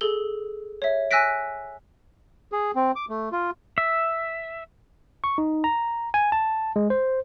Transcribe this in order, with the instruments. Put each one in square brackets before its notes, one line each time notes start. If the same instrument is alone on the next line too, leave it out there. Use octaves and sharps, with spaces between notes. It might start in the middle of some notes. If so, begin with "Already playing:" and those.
[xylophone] G#4 A4 G7
C#5 E5
G#5 E6 F#6 A#6 B6 D7
[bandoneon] G#4
C4
D6
A3
F4
[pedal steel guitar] E5
[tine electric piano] C#6
D#4
A#5
G#5
A5
G#3
C5